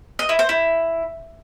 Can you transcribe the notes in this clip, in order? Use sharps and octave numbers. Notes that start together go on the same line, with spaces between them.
D#5
E4
C5
E4